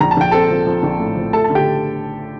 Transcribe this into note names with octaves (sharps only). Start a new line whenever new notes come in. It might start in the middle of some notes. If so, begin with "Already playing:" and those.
A#1 A#5
A5
A#1 G5
C4 A4 A5
F3
F3
A#1
A2
F3
A3 A4 A5
A5
D3
G4 G5